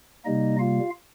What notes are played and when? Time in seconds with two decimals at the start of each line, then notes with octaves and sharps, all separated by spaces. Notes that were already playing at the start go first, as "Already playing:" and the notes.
0.25 C3 G3 A#3 D#4 D#5
0.59 F4 F5